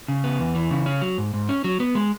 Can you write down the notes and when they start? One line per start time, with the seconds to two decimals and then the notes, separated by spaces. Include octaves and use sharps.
0.08 C#3
0.24 B3
0.40 E2
0.55 E3
0.70 C#3
0.86 C#4
1.01 F#3
1.18 G#2
1.34 G#2
1.49 C#4
1.64 F#3
1.80 B3
1.95 G#3